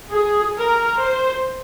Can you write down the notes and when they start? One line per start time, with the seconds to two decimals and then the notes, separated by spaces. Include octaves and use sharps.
0.12 G#4
0.56 A#4
1.00 C5